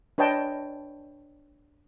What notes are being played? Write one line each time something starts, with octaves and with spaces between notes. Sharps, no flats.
D4 B4 C#5 D#5 G5 A5